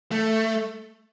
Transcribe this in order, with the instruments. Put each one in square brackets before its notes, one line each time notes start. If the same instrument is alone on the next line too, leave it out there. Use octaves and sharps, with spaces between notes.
[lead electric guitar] A3